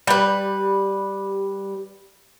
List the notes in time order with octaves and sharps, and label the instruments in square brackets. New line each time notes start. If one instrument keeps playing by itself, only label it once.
[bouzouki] G3 B4